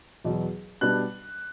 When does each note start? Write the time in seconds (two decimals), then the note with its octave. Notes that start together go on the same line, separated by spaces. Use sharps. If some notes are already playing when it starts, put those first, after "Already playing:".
0.24 E2 B2 F#3
0.81 B2 G3 B3 D4 F#6